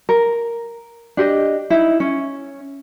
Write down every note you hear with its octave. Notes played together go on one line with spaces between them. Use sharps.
A#4
D4 G4 D#5
D#4 E4
C#4